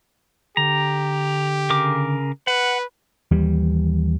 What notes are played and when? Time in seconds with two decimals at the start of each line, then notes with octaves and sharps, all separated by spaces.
0.57 D3 G4 A#5
1.70 C#3 A#4 D6
2.47 B4 F#5
3.31 D#2 E3 G3